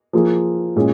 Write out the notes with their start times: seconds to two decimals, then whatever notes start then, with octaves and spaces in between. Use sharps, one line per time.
0.13 F3 A#3 F4 G#4
0.76 A#2 G#3 C#4 G#4